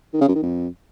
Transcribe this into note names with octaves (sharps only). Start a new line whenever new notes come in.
D#3
C#3
F#2
D#3
F2